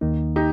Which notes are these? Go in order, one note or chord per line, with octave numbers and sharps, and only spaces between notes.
D#2 D#3 A#3 D#4
D#4 G4